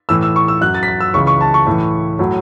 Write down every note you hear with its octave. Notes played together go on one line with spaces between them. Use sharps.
A2 E3 E6
E6
C#6
E6
F#2 F#3 F#6
A6
B6
A6
E6
C#2 C#3 E3 C#6
C#6
A5
C#6
A2 E3
A2 F#3